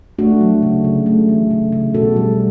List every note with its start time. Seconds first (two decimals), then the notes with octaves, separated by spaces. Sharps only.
0.19 A3 D4 F#4
0.41 F#3
0.63 C#3
0.84 C#3
1.06 A3
1.29 E3
1.51 C#3
1.72 C#3
1.94 B2 F#4 A4
2.16 G3